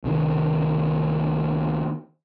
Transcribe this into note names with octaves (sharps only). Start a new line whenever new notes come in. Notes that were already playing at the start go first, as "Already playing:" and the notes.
C#2 C3 D#3